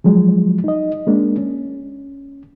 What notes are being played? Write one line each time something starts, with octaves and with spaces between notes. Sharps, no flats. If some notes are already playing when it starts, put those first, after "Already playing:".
F3 F#3 G#3
D#4 D#5
G#3 A#3 D4
C#4